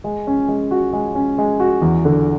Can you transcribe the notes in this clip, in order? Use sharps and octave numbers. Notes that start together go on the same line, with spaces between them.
G#3
C#4
G#3
F#4
G#3
C#4
G#3
F#4
E2
D3